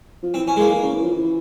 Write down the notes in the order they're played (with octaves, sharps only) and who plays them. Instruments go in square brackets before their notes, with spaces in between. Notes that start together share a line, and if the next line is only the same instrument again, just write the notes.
[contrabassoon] F3
[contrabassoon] E3 [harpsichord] C4
[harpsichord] C#4
G#3
A#3
[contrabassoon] E3
C#3
E3
F3
E3